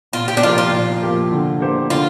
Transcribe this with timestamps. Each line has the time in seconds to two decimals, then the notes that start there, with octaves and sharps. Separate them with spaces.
0.13 A#2 F4
0.28 G4
0.37 D4
0.43 F3 A#3 F4 G4 A#4
0.58 F4
0.72 A#2
1.02 F3 A#3 G4 A#4
1.32 D3
1.60 A#3 G4 C5
1.90 D3 F4